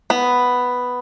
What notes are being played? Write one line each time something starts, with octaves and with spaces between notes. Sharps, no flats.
B3